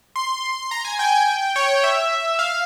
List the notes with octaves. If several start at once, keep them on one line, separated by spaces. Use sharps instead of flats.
C6
A#5
G#5
G5
C#5
E5
F5